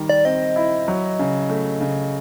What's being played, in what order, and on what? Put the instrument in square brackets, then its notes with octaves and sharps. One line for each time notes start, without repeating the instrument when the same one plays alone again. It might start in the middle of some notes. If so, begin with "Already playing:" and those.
Already playing: [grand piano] D#3 G3
[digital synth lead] D5
[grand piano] C4 [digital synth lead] D#5
[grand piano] E4
F#3
C#3
A3
C#3